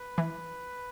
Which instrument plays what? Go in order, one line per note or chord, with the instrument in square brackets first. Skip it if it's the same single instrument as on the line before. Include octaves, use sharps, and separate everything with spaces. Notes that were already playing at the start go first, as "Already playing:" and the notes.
Already playing: [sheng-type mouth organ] B4
[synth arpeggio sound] E3